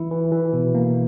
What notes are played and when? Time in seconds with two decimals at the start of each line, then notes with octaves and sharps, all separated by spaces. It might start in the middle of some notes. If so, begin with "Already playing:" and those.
Already playing: E3 E4
0.11 E3
0.32 E3
0.53 B2
0.75 A#3